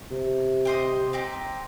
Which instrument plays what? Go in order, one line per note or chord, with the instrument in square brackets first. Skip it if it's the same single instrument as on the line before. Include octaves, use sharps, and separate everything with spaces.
[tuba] C3
[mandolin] G4 C5 D#5
C4 D#4 G4